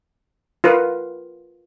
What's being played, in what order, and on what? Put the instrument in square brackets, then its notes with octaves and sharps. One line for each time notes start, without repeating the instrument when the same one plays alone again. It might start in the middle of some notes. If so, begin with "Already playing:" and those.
[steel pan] F4 A#4 B4